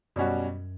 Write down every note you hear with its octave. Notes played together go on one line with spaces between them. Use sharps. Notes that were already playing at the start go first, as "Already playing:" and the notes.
F#2 B2 G3 C#4 F#4